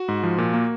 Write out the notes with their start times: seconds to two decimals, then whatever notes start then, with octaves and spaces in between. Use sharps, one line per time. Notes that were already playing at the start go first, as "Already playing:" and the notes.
Already playing: F#4
0.08 G#2
0.23 F3
0.38 A#2
0.54 A#3